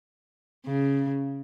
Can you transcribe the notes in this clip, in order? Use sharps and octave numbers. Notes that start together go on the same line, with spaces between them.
C#3